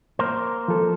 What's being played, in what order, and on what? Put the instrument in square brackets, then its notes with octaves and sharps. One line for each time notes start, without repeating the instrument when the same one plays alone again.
[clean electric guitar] A#3 A#4 C5
[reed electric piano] F3 A4